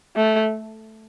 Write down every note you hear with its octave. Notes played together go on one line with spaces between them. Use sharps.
A3